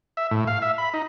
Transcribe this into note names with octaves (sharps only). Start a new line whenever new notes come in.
E5
A2
F5
E5
B5
D#4